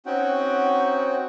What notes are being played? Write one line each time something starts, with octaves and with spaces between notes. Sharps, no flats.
C4 C#4 D#4 F#4 F#5 G5